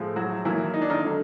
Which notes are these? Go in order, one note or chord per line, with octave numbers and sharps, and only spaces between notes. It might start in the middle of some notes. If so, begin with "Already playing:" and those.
Already playing: A2 F3 G#3
F#3 F#4
D#3 E3 F#3 A#3 E4
D#4
D4
D#3 D#4
D3 F#3 A3